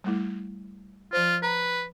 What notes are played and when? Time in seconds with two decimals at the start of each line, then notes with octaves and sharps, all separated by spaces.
0.04 G3 A3 E4
1.13 F3 F4 C5
1.43 B4 A#5